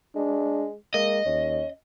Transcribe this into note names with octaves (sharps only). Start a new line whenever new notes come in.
G#3 D4
G#3 A#3 D#5
D#2 C#4